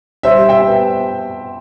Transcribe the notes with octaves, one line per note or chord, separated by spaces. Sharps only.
G3 C5 E5
E5 G5
B3